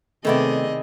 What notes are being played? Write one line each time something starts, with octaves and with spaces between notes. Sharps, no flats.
C3 D#3 A3 B3 E4 G#4 D5 D#5